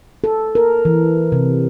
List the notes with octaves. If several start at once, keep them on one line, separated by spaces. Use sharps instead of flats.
A4
A#4
E3
C3